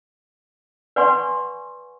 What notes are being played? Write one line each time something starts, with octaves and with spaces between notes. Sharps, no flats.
B4 D5 F#5 G#5 C6 C#6